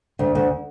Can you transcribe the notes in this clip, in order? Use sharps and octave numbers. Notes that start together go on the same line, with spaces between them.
D2
D2